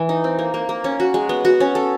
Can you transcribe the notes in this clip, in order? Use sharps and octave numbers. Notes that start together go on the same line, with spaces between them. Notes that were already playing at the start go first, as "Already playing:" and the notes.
Already playing: E3
D#4
C4
A#3
A#3
A#3
C#4
F#4
G#3
B3
F#4
C#4
A4